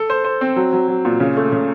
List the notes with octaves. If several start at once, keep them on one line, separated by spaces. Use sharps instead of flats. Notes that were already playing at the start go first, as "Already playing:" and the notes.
Already playing: A4
C5
C5
C4
F#3
F#3
F#3
A#2
C#3
A3
C#3